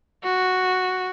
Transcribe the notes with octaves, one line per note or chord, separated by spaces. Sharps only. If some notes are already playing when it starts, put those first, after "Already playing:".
F#4